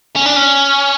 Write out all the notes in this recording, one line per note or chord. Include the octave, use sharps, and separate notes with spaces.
C#4
D4
C#4